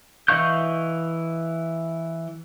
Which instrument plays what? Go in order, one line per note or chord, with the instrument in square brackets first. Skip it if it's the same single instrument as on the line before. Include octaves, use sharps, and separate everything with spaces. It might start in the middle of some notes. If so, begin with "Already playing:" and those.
[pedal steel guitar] E3 D#5 F5 C#6 G6